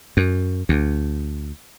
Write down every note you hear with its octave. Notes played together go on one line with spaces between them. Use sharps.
F#2
D2